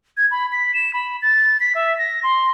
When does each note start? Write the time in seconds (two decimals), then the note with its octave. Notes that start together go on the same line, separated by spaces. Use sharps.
0.17 G#6
0.31 B5
0.52 B6
0.74 E7
0.94 B5
1.22 A6
1.60 B6
1.75 E5
1.98 A#6
2.23 C6